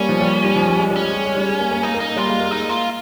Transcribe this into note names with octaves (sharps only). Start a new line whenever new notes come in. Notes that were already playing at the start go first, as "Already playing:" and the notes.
Already playing: G3 A#3 C#4
F3
G3
G3
F3
G3
G#3
G3
C#4
G#3
G3
G#3
G3
G#3
A#3
A#3
A#3 D#4
A#3
D#4
G3 F4
G#3
A#3
D#4
F4